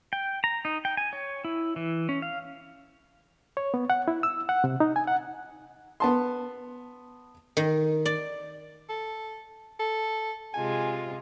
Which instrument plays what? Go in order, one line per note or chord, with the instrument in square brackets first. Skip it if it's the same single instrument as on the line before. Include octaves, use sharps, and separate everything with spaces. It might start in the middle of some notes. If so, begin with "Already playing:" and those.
[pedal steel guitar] G5
A#5
D#4
G5
G#5
C#5
E4
E3
C#4
F5
[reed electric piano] C#5
B3
F#5
E4
E6
F#5
C3
D#4
G#5
F#5
[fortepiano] B3 A5 C6
[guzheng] D#3
D5
[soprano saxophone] A4
A4
[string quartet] C3 G#3 F4 [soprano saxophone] G#5